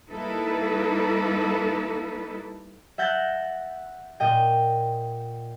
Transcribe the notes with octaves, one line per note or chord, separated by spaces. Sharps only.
G3 A#3 D#4 E4 A4 B4
E5 F#5 G6 A6 A#6
A#2 D#5 G5